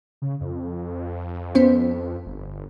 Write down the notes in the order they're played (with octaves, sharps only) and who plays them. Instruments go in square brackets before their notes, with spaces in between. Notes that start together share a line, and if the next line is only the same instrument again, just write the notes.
[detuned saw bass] C#3
F2
[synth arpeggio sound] B3 C#4 C5
[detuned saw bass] G1